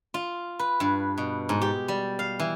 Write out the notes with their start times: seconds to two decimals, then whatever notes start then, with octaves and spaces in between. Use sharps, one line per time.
0.14 F4
0.59 B4
0.80 G2
1.18 B2
1.49 G#2
1.62 G4
1.88 G3
2.19 F5
2.39 E3